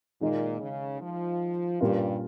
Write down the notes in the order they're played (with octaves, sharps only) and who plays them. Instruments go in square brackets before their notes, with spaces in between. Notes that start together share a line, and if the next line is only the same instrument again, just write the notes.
[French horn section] A#2 [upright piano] D#3 G#3 D#4
[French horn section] C#3
F3
[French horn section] G2 [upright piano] A#2 G3 C#4 F4 A#4